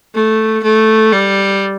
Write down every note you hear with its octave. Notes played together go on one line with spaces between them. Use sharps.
A3
A3
G3